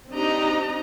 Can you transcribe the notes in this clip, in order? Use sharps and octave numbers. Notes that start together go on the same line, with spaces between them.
C4 D4 D#4 G4 D#5 A#5